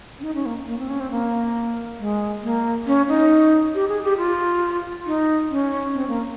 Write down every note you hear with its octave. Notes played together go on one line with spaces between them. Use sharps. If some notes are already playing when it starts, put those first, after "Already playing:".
C#4
D#4
C#4
A#3
A#3
C4
C#4
C4
A#3
G#3
A#3
C#4
D#4
G4
G#4
G4
F4
D#4
C#4
C4
A#3